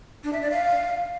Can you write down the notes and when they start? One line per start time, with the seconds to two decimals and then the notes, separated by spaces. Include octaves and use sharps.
0.24 D4
0.33 E5
0.42 D5
0.51 F5